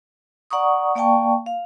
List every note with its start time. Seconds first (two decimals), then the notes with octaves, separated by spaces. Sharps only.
0.51 D5 F#5 A#5 C#6 D#6
0.95 A#3 D5 F5 G5 A5 C#6
1.46 F5